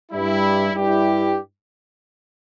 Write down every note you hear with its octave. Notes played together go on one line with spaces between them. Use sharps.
G2 G3 E4
G2 G3 E4 G4